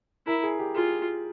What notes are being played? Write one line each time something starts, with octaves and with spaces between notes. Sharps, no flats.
E4 A#4
G#4
G4
F4 G#4